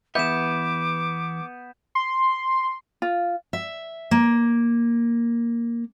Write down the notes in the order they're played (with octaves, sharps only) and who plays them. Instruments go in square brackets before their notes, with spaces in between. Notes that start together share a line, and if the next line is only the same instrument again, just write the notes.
[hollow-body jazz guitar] E2 E5 [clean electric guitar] B3 [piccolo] D6 [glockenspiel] G6 E7
[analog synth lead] C6
[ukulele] F4
[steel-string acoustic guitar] E5
A#3